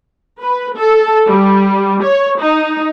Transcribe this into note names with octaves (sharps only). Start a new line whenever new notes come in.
B4
A4
G3
C#5
D#4